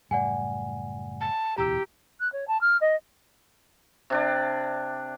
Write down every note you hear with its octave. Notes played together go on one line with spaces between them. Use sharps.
F#1 A2 G3 D5 F#5 G#5
A5
D1 E2 B2 G4 A#5 E6
F#6
C#5
A5
F6
D#5
C3 D4 D5